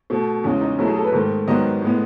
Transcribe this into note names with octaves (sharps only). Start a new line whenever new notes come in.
B2 A3
E2 C#3 G#3 C#4
D#4
B2 F#3 A3 E4
G#4
A4
B4
G#2 D#3 A3
G#2 D#3 F#3 B3 D#5
A2 G#3 B3